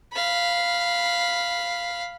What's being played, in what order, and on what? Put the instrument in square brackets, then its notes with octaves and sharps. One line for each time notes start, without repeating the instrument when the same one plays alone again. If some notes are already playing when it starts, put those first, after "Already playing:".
[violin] F5 B5